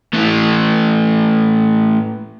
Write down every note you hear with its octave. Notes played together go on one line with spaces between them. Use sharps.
A2 E3